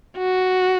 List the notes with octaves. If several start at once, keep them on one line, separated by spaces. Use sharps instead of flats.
F#4